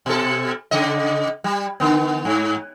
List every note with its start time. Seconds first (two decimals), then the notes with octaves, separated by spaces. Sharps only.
0.06 B2 A4
0.71 C#3 D#5
1.44 G3
1.80 D3 B3
2.25 G#2